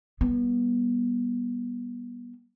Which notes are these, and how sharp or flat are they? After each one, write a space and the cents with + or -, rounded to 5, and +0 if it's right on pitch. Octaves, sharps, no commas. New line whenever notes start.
G3 +0 B3 -30